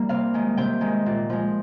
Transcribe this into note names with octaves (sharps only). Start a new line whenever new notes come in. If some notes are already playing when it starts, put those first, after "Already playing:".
Already playing: G3 A#3
C3 F5
D#3 G#3
C3 G5
D#3 G#3
A#2
F3 G#3